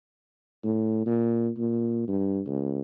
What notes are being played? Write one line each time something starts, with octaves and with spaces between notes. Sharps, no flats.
A2
A#2
A#2
G2
C#2